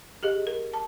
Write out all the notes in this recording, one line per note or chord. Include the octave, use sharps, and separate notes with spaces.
G4 G#4 D#5
A#4
A5